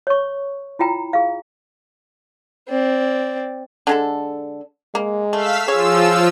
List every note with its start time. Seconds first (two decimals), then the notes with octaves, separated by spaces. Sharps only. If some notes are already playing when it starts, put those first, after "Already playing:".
0.07 C#5 C#6
0.79 E4 F4 G5 A#5
1.13 G#4 F5
2.69 C4 D5
3.87 D3 G#3 A4
4.95 G#3 A#3
5.33 A3 F5 E6 B6
5.68 F3 F4 G#4 C#5 E6